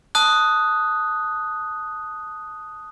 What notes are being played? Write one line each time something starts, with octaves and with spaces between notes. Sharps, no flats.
A5 D#6 F#6